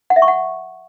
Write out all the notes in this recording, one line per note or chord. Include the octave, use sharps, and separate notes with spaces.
F#5
E5
C#6
F#5